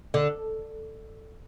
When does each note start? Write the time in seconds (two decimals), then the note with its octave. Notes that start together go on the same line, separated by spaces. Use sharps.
0.14 D3